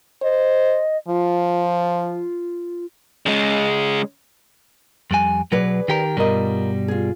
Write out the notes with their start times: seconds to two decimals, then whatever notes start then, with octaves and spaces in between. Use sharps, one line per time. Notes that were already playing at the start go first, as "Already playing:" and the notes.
0.22 C5 D#5
1.08 F3 F4
3.26 C#3 G#3
5.11 F2 G3 G#5
5.52 B1 F#3 G#4 B4 D5
5.88 D#3 G4 A#4
6.17 G2 B2 G3 F4 A#4 D#5
6.88 F4 G#4